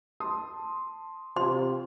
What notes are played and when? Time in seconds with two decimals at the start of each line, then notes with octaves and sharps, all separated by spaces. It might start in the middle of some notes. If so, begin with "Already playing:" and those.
0.20 A5 C6 D#6
1.37 C3 F4 C6